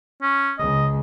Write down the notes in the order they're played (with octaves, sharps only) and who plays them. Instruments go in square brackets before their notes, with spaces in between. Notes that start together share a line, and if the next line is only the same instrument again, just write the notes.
[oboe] C#4
[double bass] C#2 [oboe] D#5